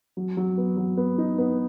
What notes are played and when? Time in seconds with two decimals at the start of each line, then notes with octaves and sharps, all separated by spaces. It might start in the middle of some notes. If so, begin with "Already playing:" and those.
0.17 F#3
0.37 F#3
0.58 B3
0.77 F#3
0.97 B3
1.18 D#4
1.38 B3